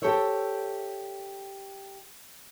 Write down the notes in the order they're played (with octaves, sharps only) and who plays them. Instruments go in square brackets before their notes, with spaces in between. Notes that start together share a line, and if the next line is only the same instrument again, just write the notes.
[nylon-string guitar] G4 A4 C5 C#5 E5